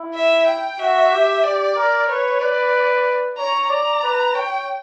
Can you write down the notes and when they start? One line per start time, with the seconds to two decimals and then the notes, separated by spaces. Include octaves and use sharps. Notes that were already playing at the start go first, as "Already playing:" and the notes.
Already playing: E4
0.15 E5
0.48 G5
0.79 F#4 E5
1.12 G4
1.43 G4 D5
1.76 A#4
2.09 B4 C#5
2.40 B4 D5
3.37 C#5 A#5
3.70 D5 A#5
4.03 B4
4.34 C#5 G5